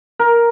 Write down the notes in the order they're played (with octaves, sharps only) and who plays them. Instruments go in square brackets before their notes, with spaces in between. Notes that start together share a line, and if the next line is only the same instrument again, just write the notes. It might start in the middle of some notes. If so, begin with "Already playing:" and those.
[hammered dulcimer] A#4